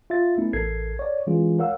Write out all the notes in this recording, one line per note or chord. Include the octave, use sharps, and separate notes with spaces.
F4 E5 A6
A3 B3 C#4 D#4 E4
A1 A4 A#4 G#6 C7
C#5 D5
E3 G#3 C#4 F4 G#4
A#4 C#5 F5 F#5 E6